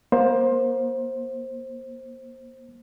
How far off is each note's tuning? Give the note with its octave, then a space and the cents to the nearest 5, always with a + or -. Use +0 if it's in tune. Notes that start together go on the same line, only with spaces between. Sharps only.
A#3 +30 C5 +15